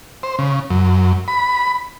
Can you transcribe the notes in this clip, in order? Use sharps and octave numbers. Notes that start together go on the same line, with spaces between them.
C5
C#3
F#2
B5